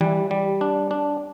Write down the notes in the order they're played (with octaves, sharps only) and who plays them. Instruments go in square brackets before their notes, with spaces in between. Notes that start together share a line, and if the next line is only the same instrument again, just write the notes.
[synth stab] E3 [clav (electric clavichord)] G3
[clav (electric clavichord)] G3
D4
D4